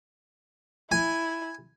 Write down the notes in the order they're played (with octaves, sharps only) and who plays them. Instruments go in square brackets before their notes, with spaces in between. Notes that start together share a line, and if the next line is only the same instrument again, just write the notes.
[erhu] E4 [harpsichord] G#5